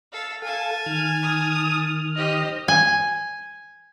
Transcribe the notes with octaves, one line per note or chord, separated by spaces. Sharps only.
A4 F5
A4 F5 G#5 A5
D#3 F6
D#6
G4 C5 D#5
G#5